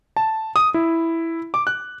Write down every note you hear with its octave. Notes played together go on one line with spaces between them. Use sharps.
A5
D#6
E4
D6
F#6